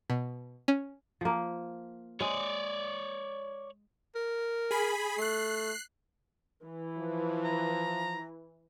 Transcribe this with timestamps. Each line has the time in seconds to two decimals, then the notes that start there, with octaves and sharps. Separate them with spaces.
0.10 B2
0.68 C#4
1.21 F3 A#3
2.20 G#3 C#5 D5
4.16 A#4
4.71 G#4 B5
5.18 A3 F#6 C7
6.65 E3
6.97 F3
7.44 A#5